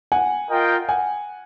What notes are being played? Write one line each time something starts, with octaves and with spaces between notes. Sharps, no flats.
F#5 G#5
F4 A#4 D#5 G5
F#5 G#5